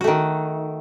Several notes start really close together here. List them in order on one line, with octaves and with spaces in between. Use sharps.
F#4 A3 D#3